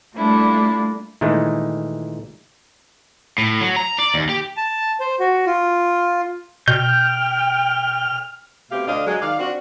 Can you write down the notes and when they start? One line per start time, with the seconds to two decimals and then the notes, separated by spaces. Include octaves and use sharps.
0.16 G3 A3 A#3 D4 E4 F4
1.21 A#2 D#3 E3 G#3 A3
3.38 A2
3.61 F#3
3.76 A#5
3.99 D5
4.14 D#2
4.29 G4
4.57 A5
5.00 C5
5.20 F#4
5.47 F4
6.68 B2 G5 F6 G6
8.71 B2 A3 C4 G4 F5
8.88 D2 D4 D#5 F5
9.07 F#3 G#3
9.22 D#3 D5 F5
9.39 C4 D4 F#4